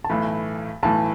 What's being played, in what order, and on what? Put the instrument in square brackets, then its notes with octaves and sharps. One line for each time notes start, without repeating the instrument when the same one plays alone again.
[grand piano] A5
[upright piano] B1 A2 E3 A3 [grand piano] B5
[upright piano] B1 A2 E3 A3 [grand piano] A5